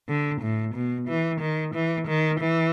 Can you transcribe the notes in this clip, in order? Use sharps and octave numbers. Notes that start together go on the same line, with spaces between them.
D3
A2
B2
E3
D#3
E3
D#3
E3